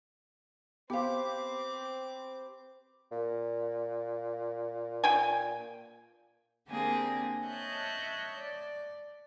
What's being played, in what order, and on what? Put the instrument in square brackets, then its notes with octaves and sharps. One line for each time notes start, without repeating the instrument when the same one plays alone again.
[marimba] B3 F5 [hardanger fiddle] C4 D6 [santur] G4 B4 C5
[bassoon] A#2
[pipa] G5 G#5
[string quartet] D3 A#3 C4 D4 G4 G#4
C#5 D#5 E5 A5 F#6 G6
D5